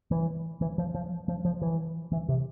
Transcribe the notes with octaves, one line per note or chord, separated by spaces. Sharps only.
E3
E3
F3
F3
F3
F3
E3
E3
C3